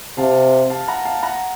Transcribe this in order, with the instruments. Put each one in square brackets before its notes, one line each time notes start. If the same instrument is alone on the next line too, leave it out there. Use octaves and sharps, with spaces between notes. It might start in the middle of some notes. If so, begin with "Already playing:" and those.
[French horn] C3 [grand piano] F5 A5
[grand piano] F5 A5
F#5 A#5
F5 A5
F#5 A#5